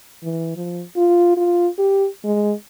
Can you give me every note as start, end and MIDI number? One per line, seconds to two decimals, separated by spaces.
0.23 0.55 52
0.56 0.83 53
0.96 1.35 65
1.37 1.67 65
1.78 2.07 67
2.24 2.52 56